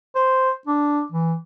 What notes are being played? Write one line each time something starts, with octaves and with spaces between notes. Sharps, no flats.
C5
D4
E3